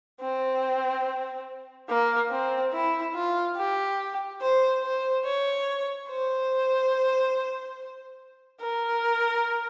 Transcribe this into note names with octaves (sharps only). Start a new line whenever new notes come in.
C4
A#3
C4
E4
F4
G4
C5
C5
C#5
C5
A#4